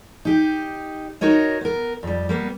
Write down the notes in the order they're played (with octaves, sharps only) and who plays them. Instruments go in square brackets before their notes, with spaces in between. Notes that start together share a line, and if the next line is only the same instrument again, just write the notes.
[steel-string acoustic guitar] D#4 G4
D#4 F#4 A#4 C#5 D#5
B3 A#4
F2 G3
G3 A#3 B3